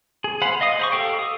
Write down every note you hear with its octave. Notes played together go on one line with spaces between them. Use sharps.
G#4
C5 F5 F#5 B5
D#5 F5 D#6
C5 B5 C#6
G4 A4 F5 G5
D#6